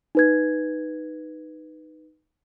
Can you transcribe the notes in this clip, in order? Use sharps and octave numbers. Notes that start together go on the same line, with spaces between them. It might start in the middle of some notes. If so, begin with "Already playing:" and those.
D#4 B4 G#6